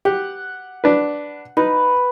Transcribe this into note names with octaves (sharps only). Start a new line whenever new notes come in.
G4 F#5
D4 B4
D#4 B4